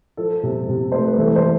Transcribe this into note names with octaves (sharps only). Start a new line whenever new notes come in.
F3 A4
C3
C3
A3 C5
B4
E3 A4
C5